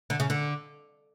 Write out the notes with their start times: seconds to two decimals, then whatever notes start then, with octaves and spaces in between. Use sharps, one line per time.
0.10 D3
0.20 C#3
0.30 D3